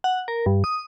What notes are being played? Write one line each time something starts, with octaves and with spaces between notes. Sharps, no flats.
F#5
A#4
G2
D#6